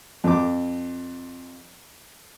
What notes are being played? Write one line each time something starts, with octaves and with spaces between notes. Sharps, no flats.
F2 D6